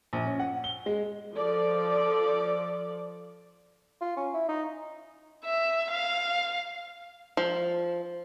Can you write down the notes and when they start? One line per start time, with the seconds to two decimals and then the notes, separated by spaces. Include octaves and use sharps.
0.13 A#1
0.26 C#4
0.39 F#5
0.64 G7
0.86 G#3
1.34 F3 A4 D5
4.01 F4
4.16 C#4
4.34 E4
4.49 D#4
5.44 E5
5.91 F5
7.37 F3